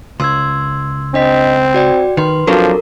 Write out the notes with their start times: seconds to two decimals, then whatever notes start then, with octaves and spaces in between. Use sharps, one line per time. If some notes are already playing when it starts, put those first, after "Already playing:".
0.20 C#2 C6 E6 G#6
1.14 C4 D4 D#5 B6
1.74 F#4 D5 G5
2.17 D#3 B4 C6
2.47 F3 F#3 C4 D4 A4 A#4